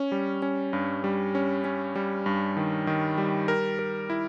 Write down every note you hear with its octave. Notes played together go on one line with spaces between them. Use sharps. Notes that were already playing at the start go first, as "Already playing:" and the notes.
Already playing: C#4
G3
C#4
G2
G3
C#4
C#4
G3
G2
D#3
D#3
G3
A#4
A#4
E4